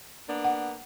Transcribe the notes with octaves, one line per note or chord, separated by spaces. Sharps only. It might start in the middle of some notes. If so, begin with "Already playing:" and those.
A#3 B3 D4
F#5